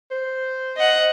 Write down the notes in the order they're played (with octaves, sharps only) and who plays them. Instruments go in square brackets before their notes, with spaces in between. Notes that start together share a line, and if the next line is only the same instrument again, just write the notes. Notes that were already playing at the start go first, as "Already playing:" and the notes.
[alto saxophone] C5
[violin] D#5 F#5